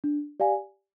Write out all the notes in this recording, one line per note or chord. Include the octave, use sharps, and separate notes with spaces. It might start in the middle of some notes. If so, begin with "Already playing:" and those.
D4
G4 D5 F5 G#5